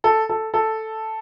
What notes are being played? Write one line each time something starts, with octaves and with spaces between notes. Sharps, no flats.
A4
A4
A4